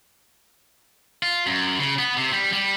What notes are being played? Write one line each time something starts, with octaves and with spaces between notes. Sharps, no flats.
F4
F#2
C#3
B3
C3
G3
G3